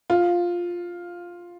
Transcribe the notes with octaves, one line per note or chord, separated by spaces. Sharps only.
F4